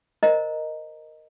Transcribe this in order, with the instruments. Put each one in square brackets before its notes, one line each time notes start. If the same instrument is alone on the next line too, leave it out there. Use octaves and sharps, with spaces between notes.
[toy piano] A#4 C5 D#5 A#5